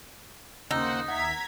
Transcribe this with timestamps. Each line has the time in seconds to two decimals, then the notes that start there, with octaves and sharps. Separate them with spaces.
0.71 D#2 C#3 A#3 D#4 C5 F#5 E6
1.08 D#2 E5 F#5 A#5 G#6 B6